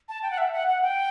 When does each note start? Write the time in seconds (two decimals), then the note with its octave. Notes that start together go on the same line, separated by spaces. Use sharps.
0.09 A5
0.23 G5
0.31 F#5
0.38 E5
0.53 F#5
0.68 F#5
0.83 G5